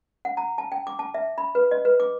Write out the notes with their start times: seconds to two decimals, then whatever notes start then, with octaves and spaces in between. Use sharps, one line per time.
0.25 F#5
0.37 A#5
0.58 A5
0.72 G5
0.87 D6
0.99 A5
1.14 E5
1.38 B5
1.55 B4
1.71 D#5
1.85 B4
2.00 D6